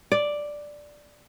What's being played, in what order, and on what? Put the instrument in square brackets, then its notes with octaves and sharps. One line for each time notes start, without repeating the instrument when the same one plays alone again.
[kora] D5